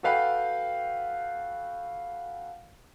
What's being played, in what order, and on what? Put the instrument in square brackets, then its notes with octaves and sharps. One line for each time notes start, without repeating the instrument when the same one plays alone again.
[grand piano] F#4 A4 B4 F5 G5